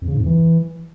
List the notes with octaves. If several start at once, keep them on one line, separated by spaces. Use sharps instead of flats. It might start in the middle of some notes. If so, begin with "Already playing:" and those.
F2
C#3
G#2
F2
E3